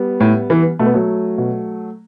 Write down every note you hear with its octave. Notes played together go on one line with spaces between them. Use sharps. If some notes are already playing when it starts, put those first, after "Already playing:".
Already playing: G3 B3
A2
E3
B2 A3
B3
F#3 A3
B2